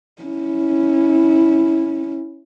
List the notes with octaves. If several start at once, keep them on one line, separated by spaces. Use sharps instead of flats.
C#4 E4